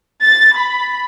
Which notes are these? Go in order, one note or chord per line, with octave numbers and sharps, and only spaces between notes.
A6
B5